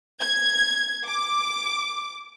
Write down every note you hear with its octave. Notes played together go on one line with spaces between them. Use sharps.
G#6
D6